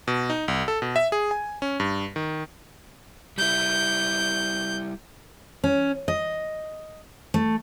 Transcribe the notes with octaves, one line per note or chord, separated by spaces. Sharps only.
B2
D#4
C2
A4
B2
E5
G#4
G#5
C#4
G2
D#3
G3 E4 G6
C#4
D#5
A3